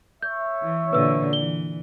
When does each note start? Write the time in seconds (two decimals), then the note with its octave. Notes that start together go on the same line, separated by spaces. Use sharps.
0.22 C#5 E5 G6
0.62 E3
0.93 A#2 D3 E3 B4 E6
1.33 E3 G7